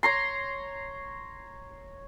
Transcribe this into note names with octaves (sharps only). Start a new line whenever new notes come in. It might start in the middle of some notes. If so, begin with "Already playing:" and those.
C#5 A#5 C6